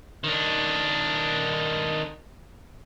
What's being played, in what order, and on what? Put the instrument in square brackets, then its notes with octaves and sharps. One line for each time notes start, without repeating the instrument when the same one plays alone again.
[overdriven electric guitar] D#3 D4